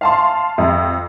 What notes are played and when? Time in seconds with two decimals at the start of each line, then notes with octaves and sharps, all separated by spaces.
0.01 F5 A5 C6
0.58 F2